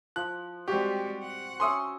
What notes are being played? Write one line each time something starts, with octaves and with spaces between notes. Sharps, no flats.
F3 F#6
G3 G#3 C4 F#4 G4
F#5
C#4 E5 C6 D#6